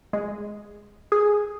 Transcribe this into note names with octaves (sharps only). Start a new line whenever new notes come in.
G#3
G#4